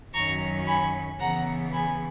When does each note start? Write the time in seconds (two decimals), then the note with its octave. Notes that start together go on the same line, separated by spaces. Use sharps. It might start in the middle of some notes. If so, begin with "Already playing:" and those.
0.14 F#2 D#3 F#3 C#4 A#5 C#6
0.67 G#5 B5
1.19 C#3 E3 B3 F#5 A#5
1.72 G#5 B5